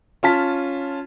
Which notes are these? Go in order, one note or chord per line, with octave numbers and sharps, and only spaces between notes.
C#4 F4 A5 B6